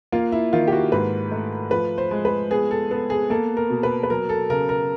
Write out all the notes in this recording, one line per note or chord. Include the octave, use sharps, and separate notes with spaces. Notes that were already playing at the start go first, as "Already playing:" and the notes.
A#3 F4
E4
D#3 F4
G4
F#4
G#2 B4
A3
F3 B4
C5
G#3
B4
B3 G#4
A4
B3 A4
G#4
A#3 A4
A#4
B2
B4
B4
F#3 A#4
A4
C#3 A#4
A#4